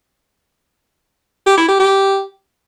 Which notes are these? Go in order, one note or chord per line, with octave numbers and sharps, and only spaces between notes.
G4
E4
G4
G4